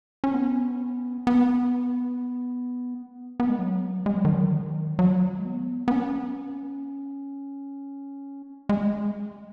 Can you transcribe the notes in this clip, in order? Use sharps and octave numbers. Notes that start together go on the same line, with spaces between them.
C#4
B3
B3
B3
G#3
F#3
G#3
F#3
D#3
F#3
D#3
F#3
G#3
B3
B3
C#4
G#3